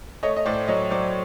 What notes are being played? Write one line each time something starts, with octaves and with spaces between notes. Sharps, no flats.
A3 C#5 D#5
D#5
A2 C5 D5
F#3 C#5 D#5
F#3 C5 D5